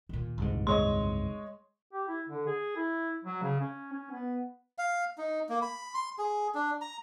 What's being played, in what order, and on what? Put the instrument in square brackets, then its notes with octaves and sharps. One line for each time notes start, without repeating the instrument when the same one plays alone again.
[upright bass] D#2 A#2
[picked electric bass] F#1 C2 G#2
[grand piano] G#3 C#5 D#5 [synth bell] C6
[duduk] G4
E4
D3
G#4
E4
F#3
C#3
C#4
C#4
B3
[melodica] F5
D#4
A#3
B5
C6
G#4
D4
A#5